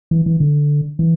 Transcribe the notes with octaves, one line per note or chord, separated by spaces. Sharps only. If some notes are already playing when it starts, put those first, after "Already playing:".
E3
E3
D3
E3